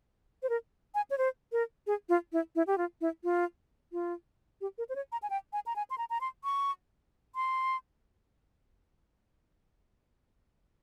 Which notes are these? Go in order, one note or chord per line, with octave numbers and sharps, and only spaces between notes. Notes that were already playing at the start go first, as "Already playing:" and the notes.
C5
A#4
G#5
C#5
C5
A#4
G#4
F4
E4
E4
G4
F4
E4
F4
F4
G4
A#4
C5
C#5
A#5
G#5
G5
G#5
A#5
G#5
C6
A#5
A#5
C6
C#6
C6